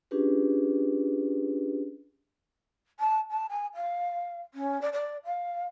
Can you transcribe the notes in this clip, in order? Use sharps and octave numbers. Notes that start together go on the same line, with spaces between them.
C#4 D4 F4 G4 G#4 B4
A5
A5
G#5
F5
C#4
D5
D5
F5